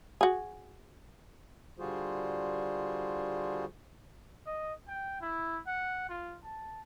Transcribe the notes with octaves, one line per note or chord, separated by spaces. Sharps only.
F#4 G#4
D3 G3 F4 F#4 G#4 C5
D#5
G5
E4
F#5
F4
A5